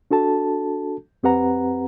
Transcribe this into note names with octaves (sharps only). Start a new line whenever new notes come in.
D4 F#4 A4 A5
F2 C4 G4 B4 F#5 A#5